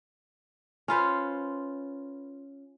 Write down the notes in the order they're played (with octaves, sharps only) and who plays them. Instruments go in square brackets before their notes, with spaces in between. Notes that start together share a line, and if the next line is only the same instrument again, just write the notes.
[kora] C#4 F4 B4 C5